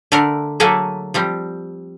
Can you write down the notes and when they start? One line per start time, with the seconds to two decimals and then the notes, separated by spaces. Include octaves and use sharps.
0.12 D3 A3 D4 A#4
0.60 F#3 A3 A#3 G#4 A4 E5
1.14 F3 G3 C4